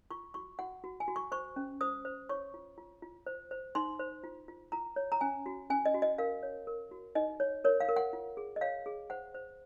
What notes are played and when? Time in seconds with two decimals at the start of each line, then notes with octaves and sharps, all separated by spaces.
0.11 F4 C#6
0.34 F#4 C#6
0.59 F#4 F#5
0.84 F#4
1.00 G#5
1.08 F#4
1.16 C#6
1.32 C5 C#6
1.56 C#4
1.81 C5 D#6
2.05 C5
2.29 C#5 C#6
2.54 F4
2.78 F4
3.02 F4
3.26 C5
3.51 C5
3.75 D#4 C6
3.99 C5
4.24 F4
4.48 F4
4.72 F4 A#5
4.96 C#5
5.12 A#5
5.21 C#4 G#5
5.46 F#4
5.70 C#4 G#5
5.85 D#5
5.94 F#4
6.02 D#5
6.18 A#4 F5
6.43 C#5
6.67 A#4
6.91 F#4
7.15 D#4 D#5
7.40 C#5
7.64 A#4 C#5
7.80 F5
7.89 A#4
7.96 F#5
8.13 F4
8.37 G#4
8.56 D#5
8.61 C#5 F5
8.86 G#4
9.10 C5 F#5
9.35 C5